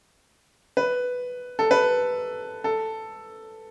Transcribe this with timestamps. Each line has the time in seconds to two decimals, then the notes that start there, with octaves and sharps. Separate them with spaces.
0.77 B4
1.59 A4
1.71 B4
2.64 A4